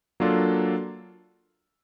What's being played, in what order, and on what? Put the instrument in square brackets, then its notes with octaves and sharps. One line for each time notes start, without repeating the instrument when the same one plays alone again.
[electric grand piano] F#3 A#3 D4 F4 A4